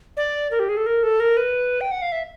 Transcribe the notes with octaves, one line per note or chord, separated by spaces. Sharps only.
D5
A#4
G4
G#4
A4
A#4
A4
A#4
B4
G5
F#5
F5
E5